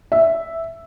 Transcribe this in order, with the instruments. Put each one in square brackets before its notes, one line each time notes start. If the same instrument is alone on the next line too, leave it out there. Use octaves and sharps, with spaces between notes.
[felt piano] E5